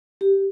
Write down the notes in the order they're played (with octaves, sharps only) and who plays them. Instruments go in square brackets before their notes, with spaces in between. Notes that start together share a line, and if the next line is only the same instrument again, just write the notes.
[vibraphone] G4